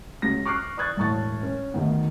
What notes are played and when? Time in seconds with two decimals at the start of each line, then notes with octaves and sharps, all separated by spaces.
0.22 C#2 C#3 F#4 A#6
0.45 C#6 D6 F6 F#6 C7
0.77 D5 C#6 D#6 F#6 G#6 A6
0.97 E1 A2 A5 C#6 A6
1.43 C#4
1.74 D2 D#3 B3